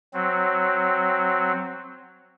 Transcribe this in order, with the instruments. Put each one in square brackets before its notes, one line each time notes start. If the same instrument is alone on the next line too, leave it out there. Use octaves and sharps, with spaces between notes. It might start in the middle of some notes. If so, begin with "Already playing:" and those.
[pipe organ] F#3 C4